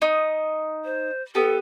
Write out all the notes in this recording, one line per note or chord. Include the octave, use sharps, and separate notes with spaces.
D#4 D#6
C5
B3 G4 A4